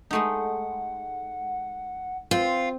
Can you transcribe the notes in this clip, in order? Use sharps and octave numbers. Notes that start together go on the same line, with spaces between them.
G#3 A3 D#4 F#5
C4 F4